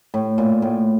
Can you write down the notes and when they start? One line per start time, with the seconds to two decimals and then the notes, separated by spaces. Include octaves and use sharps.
0.14 A2
0.38 A#2
0.62 A2